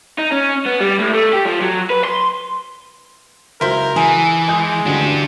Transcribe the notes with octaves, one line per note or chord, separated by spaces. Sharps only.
D#4
C#4
B3
G3
A2
A3
G4
F3
F#3
B4
C6
C#2 F#3 E4 A#4 C5
E3 G#4
G#3 G#5 D#6 G6
A1 D2 D3 D4 G4